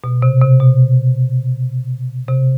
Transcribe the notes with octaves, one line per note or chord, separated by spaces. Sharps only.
B2
C3
C3
B2
C3